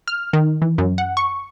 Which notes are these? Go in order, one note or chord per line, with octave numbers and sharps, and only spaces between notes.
F6
D#3
E3
F#2
F#5
C#6